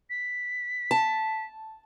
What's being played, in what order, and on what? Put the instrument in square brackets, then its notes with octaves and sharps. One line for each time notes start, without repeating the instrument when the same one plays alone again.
[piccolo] B6
[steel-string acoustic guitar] A5